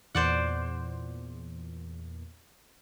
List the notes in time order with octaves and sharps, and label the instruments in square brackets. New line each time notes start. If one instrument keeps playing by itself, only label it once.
[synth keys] E2 A#2 [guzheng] C5 D5 F#5